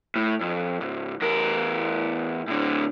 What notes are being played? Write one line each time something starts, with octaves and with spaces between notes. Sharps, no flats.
A2
F2
C#2 G#2
E2 A#4
A2 D3